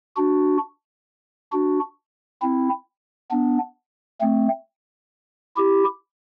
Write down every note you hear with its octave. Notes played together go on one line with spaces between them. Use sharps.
D4 F#4
D4 F#4
C4 E4
B3 D4
A3 C4
E4 G4